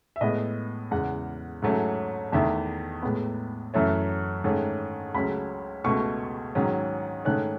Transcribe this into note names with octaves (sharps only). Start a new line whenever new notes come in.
E5
A2 G#3 B3 D#5
E2 C#3 G#3 F#5
G#2 F#3 A3 C#4
E2 D#3 A3 E5
A2 G#3 B3
F#2 E3 A3 C#4 E5
G#2 D#3 A3 C#4
C#2 C#3 F#3 A3 C#4 B5
C#2 B2 A3 C#6
G#2 D#3 F#3 C#4
G#2 D#3 A3 C#4 F#6